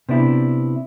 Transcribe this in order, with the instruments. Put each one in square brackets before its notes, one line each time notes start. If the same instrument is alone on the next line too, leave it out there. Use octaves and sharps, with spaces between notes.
[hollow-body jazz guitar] C3 B3 D4 E4